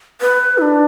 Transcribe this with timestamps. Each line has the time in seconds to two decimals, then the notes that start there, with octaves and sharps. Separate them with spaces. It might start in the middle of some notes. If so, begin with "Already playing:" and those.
0.21 B4
0.58 E4
0.62 D4